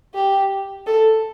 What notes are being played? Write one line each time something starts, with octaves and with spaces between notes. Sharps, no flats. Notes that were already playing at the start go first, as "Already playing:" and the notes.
G4
A4